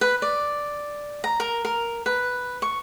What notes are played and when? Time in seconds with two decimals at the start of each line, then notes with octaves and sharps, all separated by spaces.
0.01 B4
0.22 D5
1.24 A#5
1.40 A#4
1.65 A#4
2.06 B4
2.62 C#6